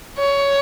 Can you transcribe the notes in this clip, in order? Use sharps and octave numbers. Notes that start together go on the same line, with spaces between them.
C#5